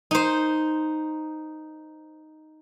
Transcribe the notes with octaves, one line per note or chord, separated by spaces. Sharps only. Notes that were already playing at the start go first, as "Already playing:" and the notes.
D#4 C5